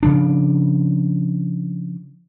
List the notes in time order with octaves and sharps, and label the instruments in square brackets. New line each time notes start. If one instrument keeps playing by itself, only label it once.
[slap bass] C#3 F3 D4